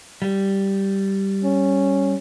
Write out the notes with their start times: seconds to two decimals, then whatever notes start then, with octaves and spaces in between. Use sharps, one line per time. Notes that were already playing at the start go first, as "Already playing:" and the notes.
0.22 G3
1.44 C#4